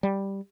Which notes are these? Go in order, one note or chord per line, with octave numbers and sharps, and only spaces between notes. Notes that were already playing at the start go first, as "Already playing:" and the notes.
G3